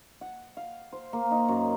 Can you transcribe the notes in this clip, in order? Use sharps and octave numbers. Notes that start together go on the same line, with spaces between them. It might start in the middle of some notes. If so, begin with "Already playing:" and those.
F#5
F5
C5
A#3
D#4
F#2